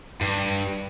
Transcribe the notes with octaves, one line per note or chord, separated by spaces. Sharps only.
G2